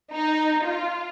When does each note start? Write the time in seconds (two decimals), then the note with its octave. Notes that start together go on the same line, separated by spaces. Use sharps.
0.14 D#4
0.65 F4